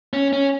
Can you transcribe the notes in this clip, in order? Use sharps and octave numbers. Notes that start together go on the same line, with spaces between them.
C#4
C#4